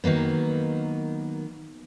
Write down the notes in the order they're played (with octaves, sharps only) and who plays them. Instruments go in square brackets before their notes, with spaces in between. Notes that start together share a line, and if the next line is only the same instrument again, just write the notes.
[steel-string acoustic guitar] D#3 F#3 A#3 B3